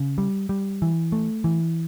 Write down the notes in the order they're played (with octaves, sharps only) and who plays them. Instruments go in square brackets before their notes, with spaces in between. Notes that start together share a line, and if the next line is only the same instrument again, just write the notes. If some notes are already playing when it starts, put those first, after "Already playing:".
Already playing: [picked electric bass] C#3
G3
G3
E3
A3
E3